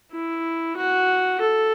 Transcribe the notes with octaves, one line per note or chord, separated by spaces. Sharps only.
E4
F#4
A4